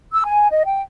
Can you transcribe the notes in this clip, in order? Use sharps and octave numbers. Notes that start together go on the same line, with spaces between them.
E6
G#5
D#5
G5